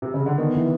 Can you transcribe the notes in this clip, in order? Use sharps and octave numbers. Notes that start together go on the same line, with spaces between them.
C3
C#3
D3
D#3 B3
E3